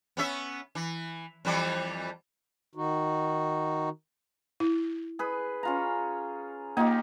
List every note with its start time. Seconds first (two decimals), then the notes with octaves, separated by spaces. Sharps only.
0.17 B3 C#4 E5
0.75 E3
1.45 F2 E3 G3
2.75 D#3 D#4 F#4
4.60 E4
5.19 G#4 B4
5.63 C#4 F4 A#5
6.77 A#3 D#4 F4 G4